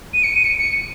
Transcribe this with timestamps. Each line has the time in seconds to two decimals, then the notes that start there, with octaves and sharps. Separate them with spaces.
0.14 D#7
0.24 C#7
0.34 D#7
0.44 C#7
0.55 D#7
0.58 C#7